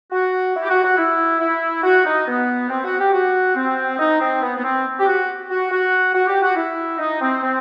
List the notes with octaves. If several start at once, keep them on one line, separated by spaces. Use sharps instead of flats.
F#4
E4
G4
F#4
F#4
E4
E4
F#4
D#4
B3
C4
F#4
G4
F#4
C4
D#4
C4
B3
B3
C4
G4
F#4
F#4
F#4
F#4
G4
F#4
E4
D#4
C4
C4